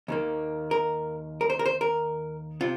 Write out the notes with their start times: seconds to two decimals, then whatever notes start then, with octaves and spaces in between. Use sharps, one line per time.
0.08 D#2 D#3 A#3
0.71 A#4
1.41 A#4
1.50 C5
1.59 A#4
1.66 C5
1.81 A#4
2.61 C3 F4